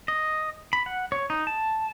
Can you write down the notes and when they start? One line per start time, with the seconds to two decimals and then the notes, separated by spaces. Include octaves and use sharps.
0.08 D#5
0.73 B5
0.86 F#5
1.12 C#5
1.30 D#4
1.47 A5